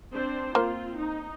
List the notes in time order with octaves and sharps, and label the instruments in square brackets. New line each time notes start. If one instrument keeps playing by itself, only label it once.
[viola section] C4 D4 C5
[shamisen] A#3 C5 [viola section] C4 F4
[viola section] D#4